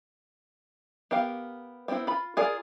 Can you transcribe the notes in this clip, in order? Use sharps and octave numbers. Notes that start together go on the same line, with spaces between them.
B3 G4 A#4 F5
B3 C4 D#4 E4 C5
F4 B5
F4 G#4 A#4 D5